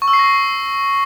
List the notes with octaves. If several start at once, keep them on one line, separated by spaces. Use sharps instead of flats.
C#6
E6
C7
A#6